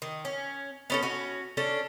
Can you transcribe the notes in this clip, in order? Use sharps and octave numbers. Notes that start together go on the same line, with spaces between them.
D#3
C#4
B3 C#4 A4
C#4 F#4
C#4 D4 A4